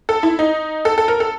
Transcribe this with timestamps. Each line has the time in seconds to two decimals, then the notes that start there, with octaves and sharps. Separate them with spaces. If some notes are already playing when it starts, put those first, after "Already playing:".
0.09 A4
0.23 E4
0.39 D#4
0.85 A4
0.98 A4
1.08 A#4
1.20 A4